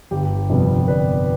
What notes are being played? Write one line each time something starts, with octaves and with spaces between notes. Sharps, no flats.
G1 G4
F2 C3 G3 B3
G1 B4 D5